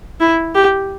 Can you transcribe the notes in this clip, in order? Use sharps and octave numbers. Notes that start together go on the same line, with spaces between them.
E4
G4